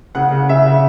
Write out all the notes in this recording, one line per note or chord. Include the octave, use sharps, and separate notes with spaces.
C#3 F#5
C#3
C#3 E5
C#3